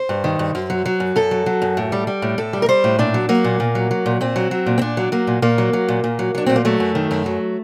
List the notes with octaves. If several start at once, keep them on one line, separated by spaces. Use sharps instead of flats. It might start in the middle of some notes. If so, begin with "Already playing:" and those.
Already playing: C5
G2
D#3
G2
F#2
F#3
F#3
F#2
F#2 A4
F#3
F#3
F#2
A2
G3
G3
A2
A2 A4
G3
A#4
G3 C5
A2
A#2 D4
F#3
F#3 A#3
A#2
A#2
F#3
F#3
A#2
A#2 C4
F#3
F#3
A#2
C4
A#2 D4
F#3
F#3 A#3
A#2
A#2 A#3
F#3
F#3
A#2
A#2
F#3
F#3 D4
A#2 C4
A#3
F#3 A3
F#2
D#3
F#2
F#3